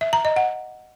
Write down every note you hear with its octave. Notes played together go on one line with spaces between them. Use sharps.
E5
A#5
D#5
F#5